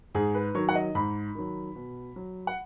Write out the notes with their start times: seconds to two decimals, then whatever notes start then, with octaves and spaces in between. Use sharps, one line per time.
0.15 G#2 G#4
0.35 B4
0.55 D#3 F#3 C#5
0.69 F#5
0.75 D#5
0.95 G#2 B5
1.35 D#3 F#3
1.76 B2
2.16 F#3
2.47 F#5